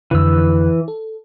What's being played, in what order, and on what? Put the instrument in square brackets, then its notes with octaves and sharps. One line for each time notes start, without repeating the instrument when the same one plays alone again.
[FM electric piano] F2 D3 F#6 [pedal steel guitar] E3 E6
[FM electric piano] A4